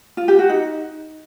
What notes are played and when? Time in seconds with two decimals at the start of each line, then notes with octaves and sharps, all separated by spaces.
0.17 F4
0.28 G4
0.39 F#4
0.50 D#4